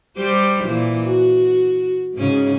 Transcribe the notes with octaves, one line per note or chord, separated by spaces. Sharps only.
G3 G4 C5
A#2 E3
F#4
G#2 C#3 C#4